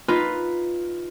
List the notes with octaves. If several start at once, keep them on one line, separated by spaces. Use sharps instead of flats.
D#4 F4 B4